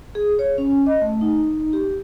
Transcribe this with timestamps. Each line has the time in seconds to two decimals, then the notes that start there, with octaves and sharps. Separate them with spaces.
0.15 G#4
0.39 C#5
0.58 C#4
0.86 D#5
1.01 A3
1.21 D#4
1.73 G4